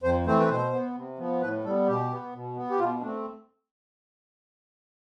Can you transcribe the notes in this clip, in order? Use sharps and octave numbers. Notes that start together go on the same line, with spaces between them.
F2 C5
E3 A3 C4 C5
B4
B2 C5
B3
C3
F3 B3
A2 B4
G3 B3 A4
B2 G4
B3
B2
B3
G4
B2 F4
A3 C4 D4